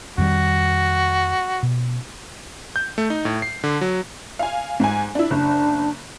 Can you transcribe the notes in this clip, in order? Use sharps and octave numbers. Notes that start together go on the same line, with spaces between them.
F2 D#3 G3 F#4
B2
G6
A3
D#4
A2
C7
D3
F#3
F5 G#5
G#2 G#5
D4 E4
F#1 D4